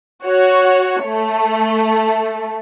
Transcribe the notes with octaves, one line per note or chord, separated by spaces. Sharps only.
F#4 C#5
A3